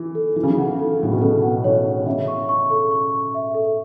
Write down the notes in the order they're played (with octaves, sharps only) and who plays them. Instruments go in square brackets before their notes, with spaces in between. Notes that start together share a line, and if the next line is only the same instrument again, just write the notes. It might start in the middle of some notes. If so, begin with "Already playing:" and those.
Already playing: [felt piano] E3
[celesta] A4
[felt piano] E3 [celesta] F#4
[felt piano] C#3
E3
[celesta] F#5
A4
[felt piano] A2 [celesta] F#4
[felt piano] B2
[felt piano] C#3 [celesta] A4
[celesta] F#5
[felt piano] E3 [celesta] C#5
[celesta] C#5
[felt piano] C#3 [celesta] E5
[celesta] C#6
C#6
A4
C#6
A4
E5
A4